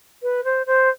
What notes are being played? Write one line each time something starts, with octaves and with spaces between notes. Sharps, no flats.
B4
C5
C5